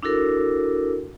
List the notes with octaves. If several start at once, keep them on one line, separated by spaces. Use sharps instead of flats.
D4 E4 F#4 A4 A#4